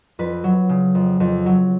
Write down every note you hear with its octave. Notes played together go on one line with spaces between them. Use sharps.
F2 B4
F#3
C#3
F2
F2
F#3